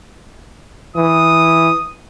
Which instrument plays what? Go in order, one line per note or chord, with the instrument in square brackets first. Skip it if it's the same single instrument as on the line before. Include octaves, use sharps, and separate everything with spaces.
[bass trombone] E3 [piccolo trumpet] D#6